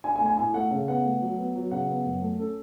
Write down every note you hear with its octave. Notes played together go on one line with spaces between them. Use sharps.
D4 G#5
G#5
A3
G#5
A2 G#5
A3 F#5
C#3
B3 F#5
A3
F#3
B3
F#3
C#3 F#5
B3
F#2
A3
C#4 A4